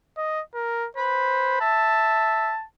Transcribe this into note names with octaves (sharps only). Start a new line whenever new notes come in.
D#5
A#4
B4 C5
E5 A5